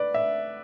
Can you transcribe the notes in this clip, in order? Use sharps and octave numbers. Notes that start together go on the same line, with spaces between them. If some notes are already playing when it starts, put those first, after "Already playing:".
Already playing: B4 D5
E5